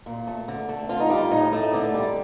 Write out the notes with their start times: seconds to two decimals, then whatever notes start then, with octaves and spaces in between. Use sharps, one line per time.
0.06 A#2
0.27 A3
0.48 D3
0.69 A3
0.89 D3 F4
1.00 D#4
1.10 G3 F4
1.31 A2 D#4
1.53 A3
1.63 D#5
1.73 D3 D5
1.94 G3